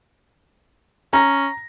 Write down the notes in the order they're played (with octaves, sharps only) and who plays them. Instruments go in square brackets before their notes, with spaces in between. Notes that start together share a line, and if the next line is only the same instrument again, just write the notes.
[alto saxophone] C#4 [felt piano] A#5 A#6